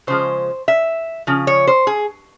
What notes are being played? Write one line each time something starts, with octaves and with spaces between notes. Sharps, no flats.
C#3 F3 G#3 C5
E5
C#3 F3
C#5
C5
G#4